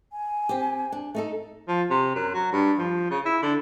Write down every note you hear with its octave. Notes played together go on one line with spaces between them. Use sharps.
G#5
C4 G4
D4
A3 D#4 A4
F3
C3
F#2
F#3
G2
F3
C#3
E4
D3